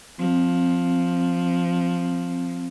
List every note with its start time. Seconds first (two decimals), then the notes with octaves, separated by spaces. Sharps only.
0.19 F3 C4